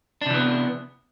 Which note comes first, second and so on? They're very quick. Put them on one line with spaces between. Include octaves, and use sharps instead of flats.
D4 C3 E3 B3